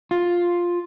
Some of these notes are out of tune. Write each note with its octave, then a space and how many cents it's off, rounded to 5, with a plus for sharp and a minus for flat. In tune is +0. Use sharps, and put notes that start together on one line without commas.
F4 +5